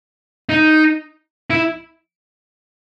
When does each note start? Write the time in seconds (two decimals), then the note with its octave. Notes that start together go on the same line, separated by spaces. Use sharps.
0.49 D#4
1.50 E4